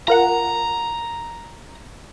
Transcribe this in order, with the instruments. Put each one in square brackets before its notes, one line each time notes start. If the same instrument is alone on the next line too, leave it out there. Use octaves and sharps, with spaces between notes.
[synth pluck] F4 A#4 F#5 [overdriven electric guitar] A#5